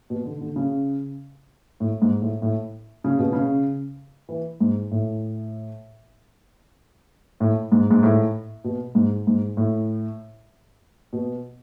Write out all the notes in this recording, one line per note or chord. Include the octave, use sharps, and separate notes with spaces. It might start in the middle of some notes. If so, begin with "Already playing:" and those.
B2
D3
D3
C#3
A2
G#2
A2
A2
C#3
B2
C#3
E3
G#2
A2
A2
G#2
G#2
A2
B2
G#2
G#2
A2
B2